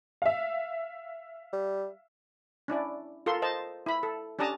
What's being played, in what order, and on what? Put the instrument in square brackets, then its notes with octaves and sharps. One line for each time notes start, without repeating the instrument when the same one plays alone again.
[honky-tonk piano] E5 F5
[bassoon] G3
[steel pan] C#4 D4 E4 D5
F4 A4 A#4 C6
C5 D#5 A5
E4 B5
A4
C#4 D4 G4 A5 A#5 D#6